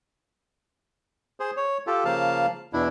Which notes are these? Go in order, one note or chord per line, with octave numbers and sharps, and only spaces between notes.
G#4 C5
C#5
F4 G4 A4
C#3 F3 A#3 F5 A5
E2 B2 D4 E4